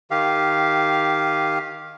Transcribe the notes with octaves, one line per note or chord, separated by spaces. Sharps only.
D#3 G4 F5